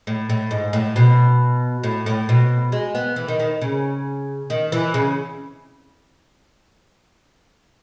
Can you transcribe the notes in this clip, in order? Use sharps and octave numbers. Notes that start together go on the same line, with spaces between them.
A2
A2
G#2
A2
B2
A2
A2
B2
G#3
B3
E3
D#3
D#3
C#3
D#3
E3
C#3